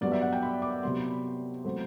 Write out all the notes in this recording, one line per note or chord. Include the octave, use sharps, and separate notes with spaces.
G2 F#3 B3 D5
E5
F#5
G5
B5
D6
C3 F#3 B3 C6
B5
B5
F#3 A3 C4